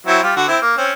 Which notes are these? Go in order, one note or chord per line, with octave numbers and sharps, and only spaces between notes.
F#3 C4 E4
G3 F4
D3 F#4
C4 E4
A#3
C4 C#4